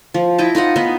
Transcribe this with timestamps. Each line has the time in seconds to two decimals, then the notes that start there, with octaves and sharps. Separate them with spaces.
0.14 F3
0.38 E4 D#5 G5 A5
0.55 D#4 F4 D#5 F#5
0.76 B3 D#4 B4 D#5